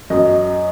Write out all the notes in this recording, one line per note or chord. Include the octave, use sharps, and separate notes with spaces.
F#2 D#5